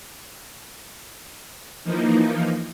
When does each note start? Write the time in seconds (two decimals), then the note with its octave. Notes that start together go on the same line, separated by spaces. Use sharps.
1.84 E3 F3 A#3 D#4